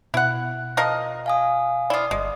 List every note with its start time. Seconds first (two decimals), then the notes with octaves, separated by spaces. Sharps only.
0.14 B2 E4 F#5
0.77 F3 A#4 D#5
1.26 F5 G#5 D#6
1.90 E4 F4 D5 D#6
2.11 G1 G#3